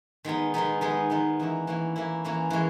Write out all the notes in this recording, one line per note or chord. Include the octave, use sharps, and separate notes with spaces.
D#3 G#3 B3 D#4
D#3 G#3 B3 D#4
D#3 G#3 B3 D#4
D#3 G#3 B3 D#4
E3 A#3 C#4 E4
E3 A#3 C#4 E4
E3 A#3 C#4 E4
E3 A#3 C#4 E4
E3 G#3 C#4